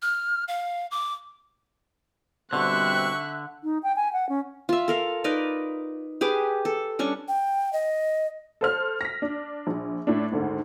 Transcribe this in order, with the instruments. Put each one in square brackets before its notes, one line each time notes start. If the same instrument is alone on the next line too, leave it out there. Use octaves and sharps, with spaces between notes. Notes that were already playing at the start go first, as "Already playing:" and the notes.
[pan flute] F6
F5
D6
[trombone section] B2 G3 C4 [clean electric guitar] D3 [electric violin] E5 F#6 [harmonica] C#6
[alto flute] D#4
G5
G#5
F#5
C#4
[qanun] F4 E5
A4 A#4 F5
D#4 A#4 B4 D5
G4 G#4 B4 D6
A4
G3 C#4 D4 C#6
[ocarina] G5
D#5
[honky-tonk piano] A4 C5 F6
A#6 B6
D4
A#1
A2 D4
G#1 D2 D3